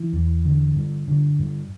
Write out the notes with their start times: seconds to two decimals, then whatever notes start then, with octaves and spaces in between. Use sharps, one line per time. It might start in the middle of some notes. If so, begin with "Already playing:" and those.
Already playing: E3
0.13 E2
0.45 D3
0.76 G2
1.08 D3
1.39 G2